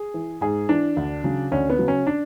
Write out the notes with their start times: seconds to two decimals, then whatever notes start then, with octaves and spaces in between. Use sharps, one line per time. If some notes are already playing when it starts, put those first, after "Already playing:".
Already playing: G#4
0.14 E3
0.41 G#2 G#4
0.69 E3 D4
0.97 D2
1.24 C#3 F#3
1.52 D2 C#4
1.70 B3
1.79 C#3 F#3
1.88 C#4
2.07 D4